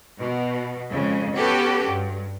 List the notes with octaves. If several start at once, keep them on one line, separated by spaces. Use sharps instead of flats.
B2
F2 C#3 G#3
B3 C#4 F#4 G4 A4 B4
G2